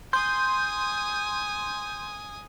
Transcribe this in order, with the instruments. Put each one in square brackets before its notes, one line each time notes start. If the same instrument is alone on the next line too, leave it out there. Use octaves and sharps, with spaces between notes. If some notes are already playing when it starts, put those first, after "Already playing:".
[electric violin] G#5 D#6 [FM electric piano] C6 G6